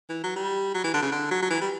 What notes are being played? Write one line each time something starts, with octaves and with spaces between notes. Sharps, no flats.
E3
F#3
G3
F#3
E3
D3
C#3
D3
F#3
F#3
E3
G3